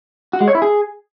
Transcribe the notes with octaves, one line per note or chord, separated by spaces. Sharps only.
F#4
G#3
C#5
E4
G#4